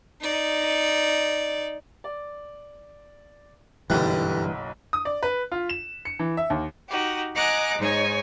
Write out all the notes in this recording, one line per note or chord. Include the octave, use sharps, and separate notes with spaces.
D#4 D5
D5
F#1 B1 G2 D3 E3 G3 F#6
D#6
D5
B4
F4
E7
C#7
E3
E5
D#2
D#4 F#4 G4
D#5 F#5 G#5 A#5 D6 F#6
G#2 D#4 C#5 G#5